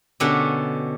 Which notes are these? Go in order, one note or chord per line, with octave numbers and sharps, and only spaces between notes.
B2 D3 B3 C#4 D4 G4